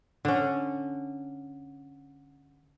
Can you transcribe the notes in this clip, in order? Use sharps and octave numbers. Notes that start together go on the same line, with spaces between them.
D3 C#4